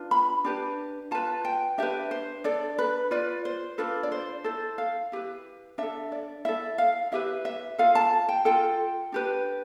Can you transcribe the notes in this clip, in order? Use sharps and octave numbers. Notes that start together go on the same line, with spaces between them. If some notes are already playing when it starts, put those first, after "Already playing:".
Already playing: D4 F4 B4
B5
D4 G4 B4
F4 B4 A5
G5
D4 G4 B4 E5
C5
D4 A4 D5
B4
F4 B4 D5
C5
D4 F4 A4 B4
D5
C5
E4 A4 C5
F5
E4 G4 B4
D4 A4 E5
D5
E4 A4 E5
F5
E4 G4 B4 E5
E5
F4 A4 F5
A5
G5
F4 A4 G5
D4 G4 B4